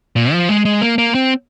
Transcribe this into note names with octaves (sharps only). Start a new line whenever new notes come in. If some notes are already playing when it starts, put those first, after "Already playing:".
A#2
F3
G#3
G#3
A#3
A#3
C4